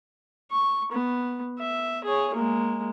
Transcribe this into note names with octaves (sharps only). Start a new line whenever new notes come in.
C#6
B3
E5
G#4 C#5
G#3 A#3